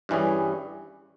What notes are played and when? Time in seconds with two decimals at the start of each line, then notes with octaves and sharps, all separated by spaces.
0.09 G2 E3 G3 C#4 G#4